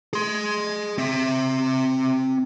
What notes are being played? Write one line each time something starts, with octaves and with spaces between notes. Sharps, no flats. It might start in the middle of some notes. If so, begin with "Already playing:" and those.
G#4 C6
C4 E5